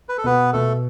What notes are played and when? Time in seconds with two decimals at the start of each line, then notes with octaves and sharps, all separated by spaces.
0.09 B4
0.18 A4
0.24 B2 B3 B4
0.53 B2 A3 A4